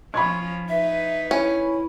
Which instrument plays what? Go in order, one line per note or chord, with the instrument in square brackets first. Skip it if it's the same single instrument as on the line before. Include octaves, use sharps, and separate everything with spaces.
[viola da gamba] F3 C#4 F4 [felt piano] B5 C#6 G#6
[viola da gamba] D#4 B4 [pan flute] E5
[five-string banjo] C#4 [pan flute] E4